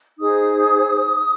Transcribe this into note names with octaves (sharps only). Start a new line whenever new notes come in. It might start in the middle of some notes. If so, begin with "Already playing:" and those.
D#4 G#4 C5 D#6